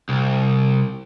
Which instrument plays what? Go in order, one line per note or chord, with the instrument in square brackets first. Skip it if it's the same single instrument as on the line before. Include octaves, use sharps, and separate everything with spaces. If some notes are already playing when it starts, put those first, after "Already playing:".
[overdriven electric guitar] C2